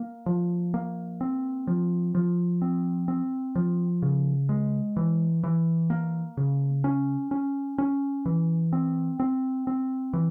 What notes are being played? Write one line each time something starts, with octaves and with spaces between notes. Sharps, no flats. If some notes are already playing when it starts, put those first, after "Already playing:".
Already playing: A#3
F3
A#3
C4
F3
F3
C4
C4
F3
C#3
G#3
E3
E3
A#3
C#3
C#4
C#4
C#4
E3
C4
C4
C4
E3